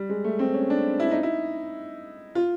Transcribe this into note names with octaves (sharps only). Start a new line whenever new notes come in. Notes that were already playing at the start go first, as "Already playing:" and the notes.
Already playing: G3
G#3
A3
C4
C#4
D4
E4
D#4
E4
F4